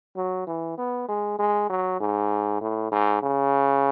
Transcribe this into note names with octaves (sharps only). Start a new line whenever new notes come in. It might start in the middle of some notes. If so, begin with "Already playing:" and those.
F#3
E3
B3
G#3
G#3
F#3
G#2
A2
G#2
C#3